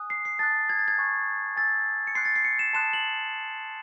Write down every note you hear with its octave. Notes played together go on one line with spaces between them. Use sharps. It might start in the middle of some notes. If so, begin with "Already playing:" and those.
Already playing: G#5 D#6 F#6
C7
C7
A5 D#6 F#6 A6
G#6
A6
G#6
G#5 C#6 F#6
G#5 C#6 E6 A6
C#7
C6 F#6 C7
A6
C7
C#7
E7
A5 C6 D#6 F#6 E7
F#7